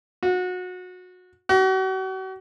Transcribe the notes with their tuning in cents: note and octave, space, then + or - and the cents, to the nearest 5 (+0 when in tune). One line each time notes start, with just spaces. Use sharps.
F#4 -25
F#4 +40